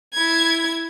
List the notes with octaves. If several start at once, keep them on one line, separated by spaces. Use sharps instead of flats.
E4 G#6